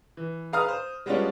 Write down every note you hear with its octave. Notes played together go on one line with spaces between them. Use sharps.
E3
G#4 B4 F5 A#5 D#6 F6
C5
G3 G#3 B3 C#4 D4 F4